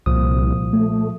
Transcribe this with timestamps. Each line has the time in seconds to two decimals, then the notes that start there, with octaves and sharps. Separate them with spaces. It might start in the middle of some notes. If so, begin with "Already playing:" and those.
0.06 C2 A#2 F3 D#6
0.73 A3